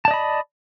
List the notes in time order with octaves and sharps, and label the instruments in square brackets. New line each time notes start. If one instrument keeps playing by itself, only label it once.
[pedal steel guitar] A5
D5
D#5
B5